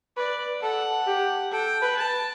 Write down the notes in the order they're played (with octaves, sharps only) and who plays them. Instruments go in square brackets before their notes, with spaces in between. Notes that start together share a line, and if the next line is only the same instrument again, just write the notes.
[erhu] B4 [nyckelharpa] D5
[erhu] A4 [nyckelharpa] F#5
[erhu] G4
[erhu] A4 [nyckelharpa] G5
[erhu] B4
[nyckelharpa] A5